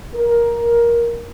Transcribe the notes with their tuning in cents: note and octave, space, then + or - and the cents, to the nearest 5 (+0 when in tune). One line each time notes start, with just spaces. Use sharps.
A#4 +10